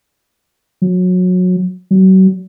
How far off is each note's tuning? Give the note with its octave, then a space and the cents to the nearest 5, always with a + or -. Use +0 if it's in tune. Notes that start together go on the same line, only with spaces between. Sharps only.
F#3 -25
F#3 +35